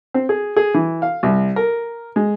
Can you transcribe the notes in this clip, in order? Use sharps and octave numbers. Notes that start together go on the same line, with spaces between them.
C4
G#4
G#4
E3
F5
C2
A#4
G#3